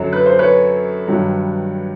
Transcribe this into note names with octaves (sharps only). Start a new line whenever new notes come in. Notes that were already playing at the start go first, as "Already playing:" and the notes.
Already playing: F#2 D3 F#3
B4
C5
B4 C#5
G2 D#3 F#3